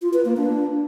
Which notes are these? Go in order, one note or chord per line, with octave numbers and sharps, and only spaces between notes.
F4
B4
A#3
D4